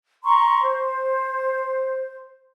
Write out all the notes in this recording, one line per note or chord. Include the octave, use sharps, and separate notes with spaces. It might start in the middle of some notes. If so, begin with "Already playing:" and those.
A#5 C6 C#6
C5